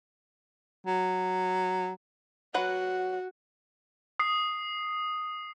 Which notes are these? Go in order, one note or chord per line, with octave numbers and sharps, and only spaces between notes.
F#3
F#3 F#4 B4 F#5
D#6 C7